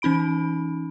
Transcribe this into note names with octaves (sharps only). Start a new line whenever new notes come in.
E3 C#4 D#4 B5 D7